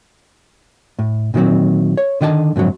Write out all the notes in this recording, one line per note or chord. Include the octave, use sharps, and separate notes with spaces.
A2
A#2 D#3 F3 F#3 C4
C#5
D3 D#3 D#5 G5 A5
F2 G#2 D3 F#3